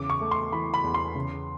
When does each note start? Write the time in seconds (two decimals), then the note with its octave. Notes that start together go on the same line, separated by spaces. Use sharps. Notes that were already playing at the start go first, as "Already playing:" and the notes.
Already playing: E2 C#3 D6
0.10 C#6
0.21 A3
0.31 C6
0.52 E3 B5
0.74 B5
0.84 E2
0.94 C6
1.15 C#3